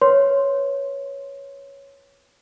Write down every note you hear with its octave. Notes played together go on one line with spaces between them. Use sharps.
B4 C#5 C6